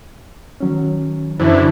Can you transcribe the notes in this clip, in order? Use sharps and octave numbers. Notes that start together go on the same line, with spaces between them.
D#3 F#3 C#4
F#2 D3 E3 E4 C5 A5